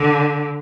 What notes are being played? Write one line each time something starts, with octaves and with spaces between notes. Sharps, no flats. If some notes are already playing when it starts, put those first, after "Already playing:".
Already playing: D3